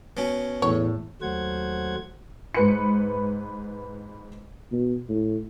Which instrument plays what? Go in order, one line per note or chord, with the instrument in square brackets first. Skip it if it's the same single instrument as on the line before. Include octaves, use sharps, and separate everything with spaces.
[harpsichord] B2 C#4
[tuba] E2 [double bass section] A2 [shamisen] C#5
[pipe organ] D#2 F#3 A3 C5 F#5 G#6
[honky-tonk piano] G#2 B4 C#7
[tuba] B2
A2